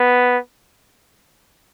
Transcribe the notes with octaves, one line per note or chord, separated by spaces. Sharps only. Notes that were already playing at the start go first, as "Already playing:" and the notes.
Already playing: B3